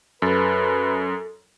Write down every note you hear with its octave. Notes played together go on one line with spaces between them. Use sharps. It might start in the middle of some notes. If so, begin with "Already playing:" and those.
F#2 A4 B4